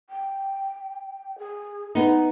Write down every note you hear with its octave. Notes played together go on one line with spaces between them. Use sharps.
G5
G#4
B3 D#4